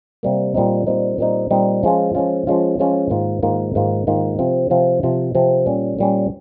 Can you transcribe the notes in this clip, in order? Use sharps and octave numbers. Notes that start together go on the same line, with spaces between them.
C3 G3 A#3
A#2 G3 C4 D#4
A#2 G3 C4 D#4
A#2 G3 C4 D#4
A#2 G3 C4 D#4
F3 G#3 C#4 F4
F3 G#3 C#4 F4
F3 G#3 C#4 F4
F3 G#3 C#4 F4
G#2 D#3 A#3 F4
G#2 D#3 A#3 F4
G#2 D#3 A#3 F4
G#2 D#3 A#3 F4
C3 F3 C4 F4
C3 F3 C4 F4
C3 F3 C4 F4
C3 F3 C4 F4
A#2 G3 C#4
A#2 G3 C#4